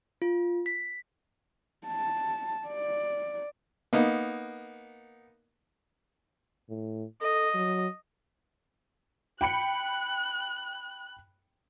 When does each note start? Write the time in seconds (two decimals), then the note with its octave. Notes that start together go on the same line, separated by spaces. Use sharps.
0.22 F4
0.66 B6
1.88 A5
2.67 D5
3.93 A#3 B3 D#4
6.69 A2
7.21 A4 D#5
7.54 F#3
9.41 G5 B5 F#6 C#7